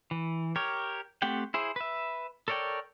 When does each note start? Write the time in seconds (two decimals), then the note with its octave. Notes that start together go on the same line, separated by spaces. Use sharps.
0.11 E3
0.56 G4 A#4 C#5
1.22 A3 C4 G4 F#5 G5
1.54 E4 G#4 C5
1.76 B4 E5
2.48 A4 A#4 C#5 D5 G5